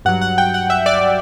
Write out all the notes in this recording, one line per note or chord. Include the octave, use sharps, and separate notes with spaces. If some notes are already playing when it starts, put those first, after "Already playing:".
G2 F#3 F#5
F#5
G5
F#5
E5
D5